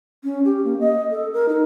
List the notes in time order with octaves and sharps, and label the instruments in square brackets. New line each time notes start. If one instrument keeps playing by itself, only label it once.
[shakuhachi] C#4
G4
A#3
D#5
A4
A#4
D#4